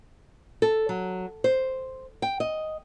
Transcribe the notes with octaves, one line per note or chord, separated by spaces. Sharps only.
A4
F#3
C5
G5
D#5